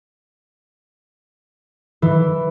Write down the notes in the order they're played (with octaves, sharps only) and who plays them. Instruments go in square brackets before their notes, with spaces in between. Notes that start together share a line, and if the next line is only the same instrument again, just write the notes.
[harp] E3